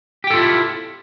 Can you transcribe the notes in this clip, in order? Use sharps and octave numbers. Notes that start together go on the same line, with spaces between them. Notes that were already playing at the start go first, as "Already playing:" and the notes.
E4 F4 G4 A4 G5